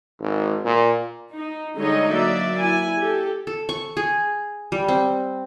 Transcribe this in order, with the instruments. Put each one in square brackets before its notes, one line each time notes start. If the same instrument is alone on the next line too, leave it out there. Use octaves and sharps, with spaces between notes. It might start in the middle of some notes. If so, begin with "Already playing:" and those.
[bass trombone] G#1
A#2
[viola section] D#4
D3 G3 G#3 D#4 C#5 D#5
F#3 A#3 D5 E5
E4 G#5
G4 A4
[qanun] A4
C#6
G#4
G3
C4